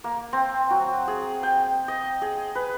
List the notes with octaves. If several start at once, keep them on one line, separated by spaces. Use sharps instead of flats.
A#3
C4
F#3
G#4
G5
D#5
G#4
B4